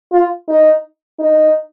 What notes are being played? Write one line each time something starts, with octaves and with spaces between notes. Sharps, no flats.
F4
D#4
D#4